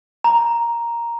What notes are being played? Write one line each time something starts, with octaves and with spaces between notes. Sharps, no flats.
A#5